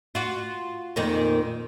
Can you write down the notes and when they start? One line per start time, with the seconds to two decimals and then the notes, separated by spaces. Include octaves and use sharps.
0.15 F4 F#4
0.96 F2 A#2 D#3